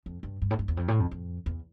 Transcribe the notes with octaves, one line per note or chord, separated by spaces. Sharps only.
F2
G2
G2
A2
G2
E2
F2
A2
F2
F2
E2